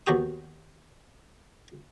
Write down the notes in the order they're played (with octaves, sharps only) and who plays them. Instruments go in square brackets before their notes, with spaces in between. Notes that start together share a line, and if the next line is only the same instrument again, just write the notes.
[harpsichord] D#2 B2 F#4 G4 D#6